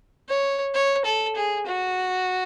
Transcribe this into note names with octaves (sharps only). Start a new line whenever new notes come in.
C#5
C#5
A4
G#4
F#4